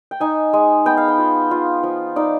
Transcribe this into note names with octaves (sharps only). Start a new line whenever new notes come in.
G5
D#4 G#5
G#3
B3 G5
F5
G5
F4
F4
F3
D#4 D5